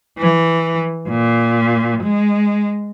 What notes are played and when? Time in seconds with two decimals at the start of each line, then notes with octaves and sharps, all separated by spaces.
0.18 E3
1.08 A#2
2.03 G#3